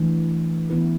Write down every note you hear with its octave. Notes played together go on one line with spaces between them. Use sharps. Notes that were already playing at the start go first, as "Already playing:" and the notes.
Already playing: E3 A3 D4
E3 B3 E4 B4